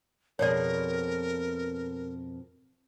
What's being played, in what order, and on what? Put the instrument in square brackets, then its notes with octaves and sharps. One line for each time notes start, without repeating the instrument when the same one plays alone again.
[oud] F2 B2 G#4 [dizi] A#4 [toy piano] C#5 D5